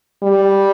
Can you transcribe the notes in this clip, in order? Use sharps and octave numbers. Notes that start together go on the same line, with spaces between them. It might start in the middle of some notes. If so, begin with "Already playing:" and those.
G3